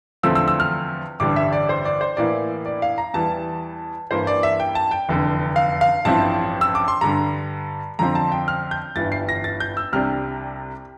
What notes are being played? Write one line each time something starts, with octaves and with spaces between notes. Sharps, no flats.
E2 D3 F3 A3 C4 E6
E6
E6
F6
A1 G2 D3 G3 D4 D6
E5
D5
C5
D5
C5
A2 E3 A#3 E4 D5
D5
F5
A#5
E2 E3 G3 A5
G2 E3 A#3 C5
D5
E5
G5
A5
G5
F1 E2 D3
F5
F5
A1 G2 F3 C4 E4 A5
E6
D6
C6
G2 D3 G3 A#5
F2 D3 F3 C4 A#5
A5
G5
F6
G6
G1 G2 E3 A6
C7
A#6
A6
G6
E6
C2 C3 G3 D4 F6